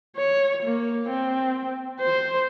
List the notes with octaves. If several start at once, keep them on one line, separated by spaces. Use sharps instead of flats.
C#5
A#3
C4
C5